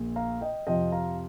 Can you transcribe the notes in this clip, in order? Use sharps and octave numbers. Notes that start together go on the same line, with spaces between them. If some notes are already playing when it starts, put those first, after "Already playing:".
Already playing: A#1 A#2
F5 A#5
D#5 G5
F2 C3 F3 D#5 G5
F5 A#5